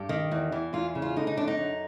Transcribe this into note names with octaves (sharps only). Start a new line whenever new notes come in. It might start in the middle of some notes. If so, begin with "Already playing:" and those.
Already playing: G2 G4
D#3
E2
E3
E2 F4
C#3
F4
D3 D#4
D#4
F#2 D4
D#4
F#2